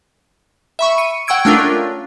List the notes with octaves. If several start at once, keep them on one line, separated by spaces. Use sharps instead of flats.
E5 B5 C#6
C#7 D#7
F#5 G5 C#6 E6 G#6 D7
A3 C#4 D4 F4 A#4